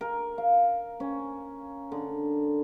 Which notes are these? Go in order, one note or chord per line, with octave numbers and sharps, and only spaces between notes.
A#4
F5
C#4
D3